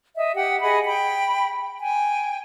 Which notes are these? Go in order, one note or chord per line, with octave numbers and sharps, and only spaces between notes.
D#5 E5
G4 F#5 G5
G#4 D#5 F#5 B5
G5 B5
G5 G#5